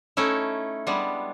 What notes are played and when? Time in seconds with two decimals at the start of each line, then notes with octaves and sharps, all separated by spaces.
0.17 A3 C#4 D#4 E4
0.87 G3 G#3 B3 D4